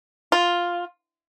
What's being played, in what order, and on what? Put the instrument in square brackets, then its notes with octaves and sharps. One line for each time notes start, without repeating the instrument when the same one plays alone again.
[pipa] F4